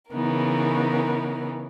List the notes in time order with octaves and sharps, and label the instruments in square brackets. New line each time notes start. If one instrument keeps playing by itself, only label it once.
[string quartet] C#3 E3 B3 D#4 A#4